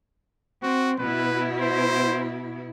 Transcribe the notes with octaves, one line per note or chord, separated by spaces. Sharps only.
C4 F#4
B2 E4 B4
C5